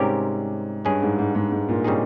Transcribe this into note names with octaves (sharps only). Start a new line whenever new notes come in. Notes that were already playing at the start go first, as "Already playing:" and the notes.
Already playing: G#2 C3 G3 C#4 G4 A#4
G2 G#3 C#4 G#4
G#2
G#2
G#2
G#2
A#2
C#3 G3 C4 D#4 G#4